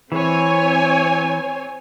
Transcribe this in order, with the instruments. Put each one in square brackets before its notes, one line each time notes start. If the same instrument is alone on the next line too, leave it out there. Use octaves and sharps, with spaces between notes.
[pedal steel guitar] E3 [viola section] C4 C#5 G#5